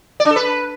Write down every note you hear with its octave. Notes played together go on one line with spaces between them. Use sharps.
D5
D4
A4
B4